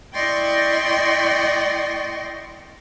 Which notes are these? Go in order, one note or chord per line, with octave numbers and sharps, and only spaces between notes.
E4 D5 D#5 G5 C6 C#6